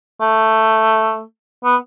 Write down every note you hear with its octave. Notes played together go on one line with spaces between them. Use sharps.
A3
B3